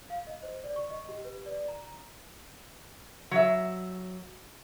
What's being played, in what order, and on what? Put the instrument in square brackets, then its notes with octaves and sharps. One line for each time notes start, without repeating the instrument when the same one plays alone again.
[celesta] F5
D#5
C5
D5
C#6
D#5
G4
B4
D5
A#5
A#5
[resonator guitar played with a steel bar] F#3 E5